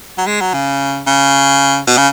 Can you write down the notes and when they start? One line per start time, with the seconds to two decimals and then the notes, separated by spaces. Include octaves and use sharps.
0.18 F#3
0.27 G#3
0.41 F#3
0.54 C#3
1.07 C#3
1.87 B2
1.97 C#3